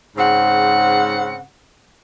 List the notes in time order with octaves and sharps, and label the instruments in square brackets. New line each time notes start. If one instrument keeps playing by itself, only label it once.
[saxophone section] G#2 C#3 C4 F#5